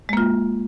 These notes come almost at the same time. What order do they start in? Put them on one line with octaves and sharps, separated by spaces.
G#3 A#3 F4